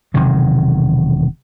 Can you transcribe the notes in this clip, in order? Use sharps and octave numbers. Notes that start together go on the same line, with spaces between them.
E1 C3 D#3 F#3